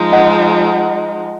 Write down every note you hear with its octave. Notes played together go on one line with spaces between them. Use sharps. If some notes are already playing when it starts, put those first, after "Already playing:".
Already playing: F3 G#3 D#4
D#5 F#5